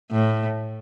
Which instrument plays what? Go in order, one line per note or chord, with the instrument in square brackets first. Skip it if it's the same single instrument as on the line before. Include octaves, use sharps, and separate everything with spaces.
[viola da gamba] A2